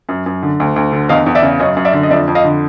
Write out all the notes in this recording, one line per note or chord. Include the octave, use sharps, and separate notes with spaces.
F#2
F#2
D3
D2
D2
D3
E2 D#5 F5
E2
D5 E5
C#3
F#2 C#5 D#5
F#2
D5 E5
D3
D#5
F2 D5 E5
F2
D#5 F5
D3